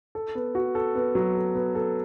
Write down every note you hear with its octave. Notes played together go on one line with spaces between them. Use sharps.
A4
B3
F#4
A4
B3
F#3
A4
B3
A4